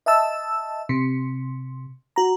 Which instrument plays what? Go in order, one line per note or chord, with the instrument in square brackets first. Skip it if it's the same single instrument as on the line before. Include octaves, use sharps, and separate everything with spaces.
[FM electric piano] D#5 E5 A5 E6
C3
F#4 A#5